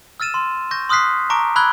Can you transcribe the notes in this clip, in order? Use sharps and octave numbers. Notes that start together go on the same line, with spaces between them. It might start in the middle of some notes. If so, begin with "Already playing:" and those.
E6 F6 A6 D#7 E7
C6
C#6 G6 A#6
C6 D#6 F6 F#6 B6 C7
A5 A#5 C#6 D6 A#6 D7
B5 E6 F#6 G#6 G7